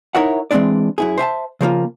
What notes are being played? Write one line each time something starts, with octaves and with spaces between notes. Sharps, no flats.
D#4 E4 A#4 C#5 E5 F#5
E3 G#3 A3 C4 D4 D5
F#2 E4 G#4
C5 E5 G#5 A5
C#3 F3 A#3 F4